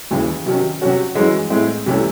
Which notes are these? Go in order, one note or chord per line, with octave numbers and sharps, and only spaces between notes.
D#2 C#3 E3
C3 D#3 F#3 C#4
C3 F#3 C#4 F#4
F#2 E3 G#3 C#4 F#4
A2 G#3 C4 E4
C2 C3 E3 A3 C#4